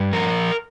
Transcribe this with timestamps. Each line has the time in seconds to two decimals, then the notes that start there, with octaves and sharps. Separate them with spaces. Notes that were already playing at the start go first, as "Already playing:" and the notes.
Already playing: G2
0.13 F3 A#4